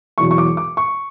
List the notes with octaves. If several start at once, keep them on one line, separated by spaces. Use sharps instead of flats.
E1 E2 B2 F#3 C#6
C#6
D6
D6
C#6